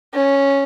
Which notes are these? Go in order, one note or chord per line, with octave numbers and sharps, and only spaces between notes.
C#4